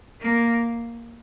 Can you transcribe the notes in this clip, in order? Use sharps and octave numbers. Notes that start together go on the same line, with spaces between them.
A#3